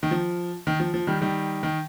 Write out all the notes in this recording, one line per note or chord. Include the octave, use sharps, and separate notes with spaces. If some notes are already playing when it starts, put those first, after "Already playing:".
D#3
F3
D#3
F3
F3
D#3 G3
D#3 G3
D#3